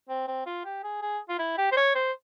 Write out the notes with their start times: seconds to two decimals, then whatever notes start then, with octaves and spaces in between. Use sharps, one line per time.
0.09 C4
0.28 C4
0.46 F4
0.65 G4
0.84 G#4
1.02 G#4
1.29 F4
1.39 E4
1.58 G4
1.72 C5
1.77 C#5
1.95 C5